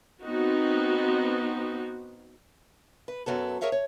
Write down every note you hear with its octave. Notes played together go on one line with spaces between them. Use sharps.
B3 C4 D#4 F#4
B4
F#2 F#3 B3 A4
G#4 A#4 C#5 E5 F5
C#5